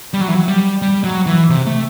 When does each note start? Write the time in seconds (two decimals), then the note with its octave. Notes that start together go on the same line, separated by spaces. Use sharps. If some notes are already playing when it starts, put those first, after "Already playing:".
0.14 G3
0.21 F#3
0.28 E3
0.35 F#3
0.48 G3
0.82 G3
1.04 F#3
1.26 E3
1.49 C3
1.66 A3